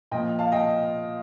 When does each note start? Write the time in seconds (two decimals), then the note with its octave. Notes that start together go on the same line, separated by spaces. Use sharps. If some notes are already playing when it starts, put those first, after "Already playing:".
0.11 A#2 F3 D#5 G5
0.39 F5 A5
0.52 D#5 G5